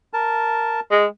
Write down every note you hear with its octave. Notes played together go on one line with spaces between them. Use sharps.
A#4 A5
G#3